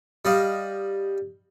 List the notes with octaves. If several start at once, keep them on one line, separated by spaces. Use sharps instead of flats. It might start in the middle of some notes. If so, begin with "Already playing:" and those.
G3 D#5 F5